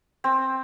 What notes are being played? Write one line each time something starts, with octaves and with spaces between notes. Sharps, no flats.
C4